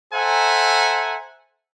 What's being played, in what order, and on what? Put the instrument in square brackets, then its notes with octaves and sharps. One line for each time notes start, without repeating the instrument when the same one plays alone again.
[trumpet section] A4 C5 E5 F#5 G#5 A#5